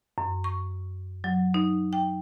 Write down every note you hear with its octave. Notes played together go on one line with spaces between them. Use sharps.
F#2
C#6
F#3
D#4
G5